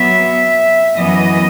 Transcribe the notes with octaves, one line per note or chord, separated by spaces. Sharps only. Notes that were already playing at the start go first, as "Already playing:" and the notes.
Already playing: F#3 B3 E5
F#2 E3 B3 D#5